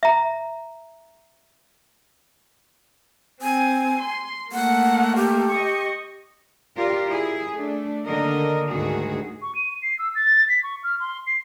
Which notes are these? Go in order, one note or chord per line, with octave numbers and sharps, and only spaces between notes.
E5 A#5
C4 G#5
C6
A3 A#3 F#5
G4
D#5 C#6
F4 G4 A#4 D5
E4 G#4
A3 D4
D3 D#3 A#3 A#4 D#5
D2 G#2 D#3 G3 F#4 G#4
C#6
D#7
C7
E6
A6
B6
C#6
F6
C6
C7